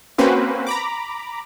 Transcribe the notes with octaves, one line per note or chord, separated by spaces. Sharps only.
A#3 C4 C#4 F#4 B4 C5
A#5 B5 D6